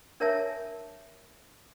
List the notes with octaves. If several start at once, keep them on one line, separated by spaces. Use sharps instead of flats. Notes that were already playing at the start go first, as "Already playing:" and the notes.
D4 A#4 C#5 E5 G#5 A5